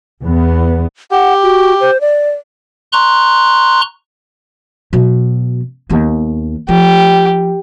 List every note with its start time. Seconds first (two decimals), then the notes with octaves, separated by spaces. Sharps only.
0.24 E2 B3
1.11 G4 F#5
1.43 F#4
1.81 C5
2.01 D5
2.93 A#5 C6 C#6 F#6
4.93 B2 F#3
5.89 D#2 B3
6.69 F3 G4